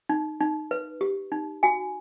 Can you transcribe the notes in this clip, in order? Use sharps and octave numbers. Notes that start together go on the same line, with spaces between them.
D#4
D#4
B4
G4
D#4
F#4 G#5